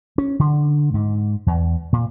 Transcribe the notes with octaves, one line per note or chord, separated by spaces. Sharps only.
C#4
D3
G#2
E2
A#2